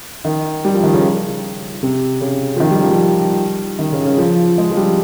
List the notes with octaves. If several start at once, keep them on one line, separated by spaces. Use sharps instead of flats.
D#3
G3
F3
D#3
C#3
C3
C#3
F3
D#3
G3
F3
G3
D#3
C#3
C#3
F3
G#3
F3
G3